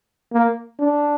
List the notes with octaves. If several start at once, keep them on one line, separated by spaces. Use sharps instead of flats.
A#3
D4